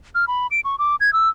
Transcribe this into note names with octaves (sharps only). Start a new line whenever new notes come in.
F6
B5
D7
C#6
D6
G#6
E6